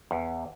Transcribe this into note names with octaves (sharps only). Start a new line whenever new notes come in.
E2